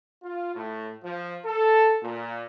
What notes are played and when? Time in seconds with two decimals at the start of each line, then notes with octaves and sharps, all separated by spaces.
0.23 F4
0.56 A2
1.03 F3
1.46 A4
2.03 A#2